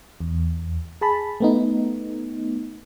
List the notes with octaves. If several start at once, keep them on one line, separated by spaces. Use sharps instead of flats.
E2
G#4 A5 B5
A3 B3 D#4